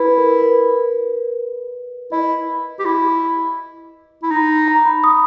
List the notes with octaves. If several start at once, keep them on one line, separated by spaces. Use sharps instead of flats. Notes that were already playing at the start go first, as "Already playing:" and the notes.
Already playing: E4 B4
A#4
B4
E4 D#5
G4
E4
E4
D#4
A#5
B5
D#6